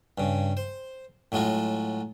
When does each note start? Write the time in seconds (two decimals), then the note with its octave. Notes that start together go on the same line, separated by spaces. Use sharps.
0.18 G2 C#3
0.57 C5
1.32 A2 F#3 G#3 F4 F#4